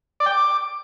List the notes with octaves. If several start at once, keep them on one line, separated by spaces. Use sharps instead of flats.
D5
G5
D6